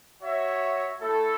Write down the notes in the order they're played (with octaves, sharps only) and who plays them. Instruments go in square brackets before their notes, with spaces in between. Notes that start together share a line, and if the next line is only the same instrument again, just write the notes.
[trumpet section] F#4 C#5 E5
A3 E4 A4